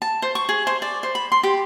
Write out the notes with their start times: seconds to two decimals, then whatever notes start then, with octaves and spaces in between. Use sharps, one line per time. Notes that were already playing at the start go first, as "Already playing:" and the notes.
0.02 A5
0.22 C5
0.35 C#6
0.49 G#4
0.67 C5
0.82 D5
1.03 C5
1.15 B5
1.32 C6
1.43 G4